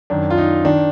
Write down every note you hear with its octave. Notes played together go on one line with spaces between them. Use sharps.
F#2 D#3 D4
F4
D#4
D#3 D4